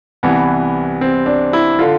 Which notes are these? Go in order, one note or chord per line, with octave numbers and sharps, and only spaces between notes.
C2 C3 E3 B3
C4
D4
E4
D3 F4